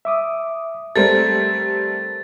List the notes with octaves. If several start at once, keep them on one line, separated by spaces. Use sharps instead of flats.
E5 D6 D#6
G3 A3 C4 A4 A#4 C5 A6